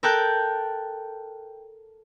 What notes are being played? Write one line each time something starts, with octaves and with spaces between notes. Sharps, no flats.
A4 A#4 G5 A5 F#6 G6